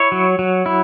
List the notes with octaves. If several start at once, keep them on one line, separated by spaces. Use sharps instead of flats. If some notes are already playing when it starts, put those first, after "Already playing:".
Already playing: E4 C#5
F#3
F#3
E4